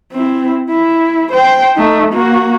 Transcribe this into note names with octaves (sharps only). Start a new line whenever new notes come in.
C4 E4
E4
C5 G5
A3 D#4
A#3 F#4